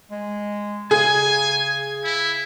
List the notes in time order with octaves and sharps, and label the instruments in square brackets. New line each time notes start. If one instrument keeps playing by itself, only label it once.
[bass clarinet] G#3
[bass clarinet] C#3 [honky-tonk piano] G#4 [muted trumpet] G#5
[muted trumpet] E4